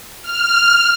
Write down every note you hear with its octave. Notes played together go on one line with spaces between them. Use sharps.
F6